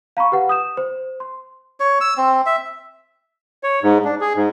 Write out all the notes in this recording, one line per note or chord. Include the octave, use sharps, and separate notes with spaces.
F5 A#5 B5 C#6
G4 B4 F#5
D#6 G6 E7
C5
C6
C#5
E6
C4
E5
C#5
G#2
D4
G#4
G#2